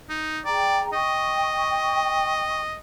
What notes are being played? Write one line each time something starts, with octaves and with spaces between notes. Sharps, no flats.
D#4
G#4 D5 G5 A#5
D#5 G5 C#6